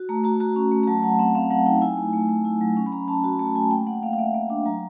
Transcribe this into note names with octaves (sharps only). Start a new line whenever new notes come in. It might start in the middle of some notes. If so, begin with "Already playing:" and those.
Already playing: F#4
A3 A#5
F#4 A#5
F#4 A#5
C#4
A3
A#5
F#3 A5
F#3 F#5
C4 F#5
C4 F5
F#3 F#5
D#4 G5
E4 G#5
A3
A3
A3
E4
F#3
C#4
B5
C#4 A#5
C#4 A5
F#4 A#5
A3 A5
A3 G#5
A#3 G5
A#3 F#5
A#3 F5
F5
A#3 E5
A#3
D4
F#3 A#5